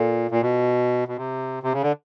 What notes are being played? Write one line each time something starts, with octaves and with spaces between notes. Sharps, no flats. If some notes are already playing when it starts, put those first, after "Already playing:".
Already playing: A#2 F4 A4
A#2
B2
B2
C3
C3
C#3
D3